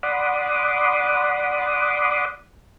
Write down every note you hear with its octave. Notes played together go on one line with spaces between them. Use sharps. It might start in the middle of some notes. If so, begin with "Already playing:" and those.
D5 F#5 B5 C6 D6 D#6